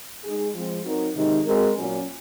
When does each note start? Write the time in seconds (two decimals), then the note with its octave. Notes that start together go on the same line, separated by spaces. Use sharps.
0.24 G#3 D#4 G#4
0.55 F3 G#3 C4
0.85 F#3 C4 D#4 F#4 A#4
1.15 C3 D#3 G#3 D#4
1.46 G#3 C4 F#4 A#4
1.77 A#2 F#3 C#4